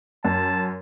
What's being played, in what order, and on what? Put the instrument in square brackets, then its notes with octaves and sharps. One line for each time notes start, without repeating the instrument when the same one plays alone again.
[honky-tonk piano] F#2 [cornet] A5